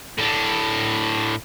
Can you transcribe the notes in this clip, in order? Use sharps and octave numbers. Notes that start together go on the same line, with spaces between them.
A2 D4